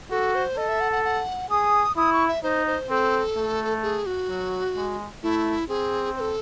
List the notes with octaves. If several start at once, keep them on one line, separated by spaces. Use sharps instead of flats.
F#4 A4
C5
A4 D#5
E5
F#5
F#5
F#5
G#4 D#6
E4 D#6
C#6
E5
D#4 C5
C5
C4 A4
A3
G#4
F#4
F#3
G#3
A3 E4
C4 G#4
C5
A4